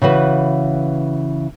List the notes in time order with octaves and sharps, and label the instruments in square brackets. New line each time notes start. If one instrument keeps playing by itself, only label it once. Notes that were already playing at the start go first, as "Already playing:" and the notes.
[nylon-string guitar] C#3 E3 F#4 B4